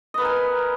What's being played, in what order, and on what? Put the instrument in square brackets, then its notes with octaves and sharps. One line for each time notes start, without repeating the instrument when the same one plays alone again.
[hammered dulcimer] D#5
B4
A#4
G#5